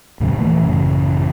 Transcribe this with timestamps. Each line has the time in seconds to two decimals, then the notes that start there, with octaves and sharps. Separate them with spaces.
0.20 D#2 A2 C#3 F#3
0.38 A#2 E3 F3 A3
0.62 A1 F#2 C#3